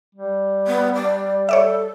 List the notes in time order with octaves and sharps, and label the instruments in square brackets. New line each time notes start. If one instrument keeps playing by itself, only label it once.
[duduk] G3
[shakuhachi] B3
D5
[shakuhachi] A4 [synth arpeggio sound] C#5 D5 E5